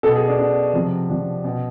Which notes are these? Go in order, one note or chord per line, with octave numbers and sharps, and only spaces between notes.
B2 A4
G#4
D4
B2 D4
C3 F3
C3 F3 D4
B2